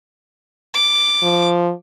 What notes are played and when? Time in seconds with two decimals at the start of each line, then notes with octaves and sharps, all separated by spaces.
0.74 D6
1.23 F3